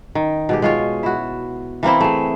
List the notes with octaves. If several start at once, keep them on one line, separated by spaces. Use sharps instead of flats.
D#3
B2 G#3 G4
G#3 F4 C#5
E4 F#4
E3 A#3 C4 E4
A3 G#4